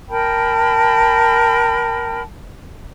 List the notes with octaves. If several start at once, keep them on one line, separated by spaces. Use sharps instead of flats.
A#4 G5 A5 B5